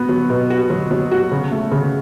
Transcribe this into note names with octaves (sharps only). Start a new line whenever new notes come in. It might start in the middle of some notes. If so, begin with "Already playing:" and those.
Already playing: B3 F#4
F#3
B2
F#4
F#3
F#3
F#4
C#3
A3
C#3